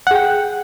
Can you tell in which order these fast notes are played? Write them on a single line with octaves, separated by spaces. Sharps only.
F#5 G#4 G5